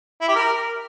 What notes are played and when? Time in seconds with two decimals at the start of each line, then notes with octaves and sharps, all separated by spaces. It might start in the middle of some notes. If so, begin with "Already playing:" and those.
0.21 E4
0.28 G4
0.35 A#4